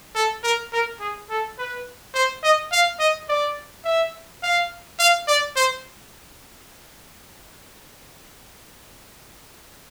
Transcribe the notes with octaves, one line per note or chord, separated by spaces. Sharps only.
A4
A#4
A#4
G#4
A4
B4
C5
D#5
F5
D#5
D5
E5
F5
F5
D5
C5